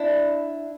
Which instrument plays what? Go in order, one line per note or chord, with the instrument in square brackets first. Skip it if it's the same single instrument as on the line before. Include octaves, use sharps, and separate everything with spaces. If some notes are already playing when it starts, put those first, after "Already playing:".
Already playing: [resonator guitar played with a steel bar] D4 E4